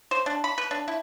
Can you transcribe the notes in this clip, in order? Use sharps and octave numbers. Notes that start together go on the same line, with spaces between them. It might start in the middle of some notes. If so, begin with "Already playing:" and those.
C5
D4
B5
B4
D4
E4